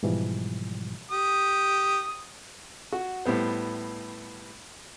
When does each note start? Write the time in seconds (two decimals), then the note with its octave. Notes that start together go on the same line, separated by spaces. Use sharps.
0.03 G#2 B2 E3 F3 G3
1.12 G4 D#6
2.92 F#4
3.25 A2 G3 B3 C5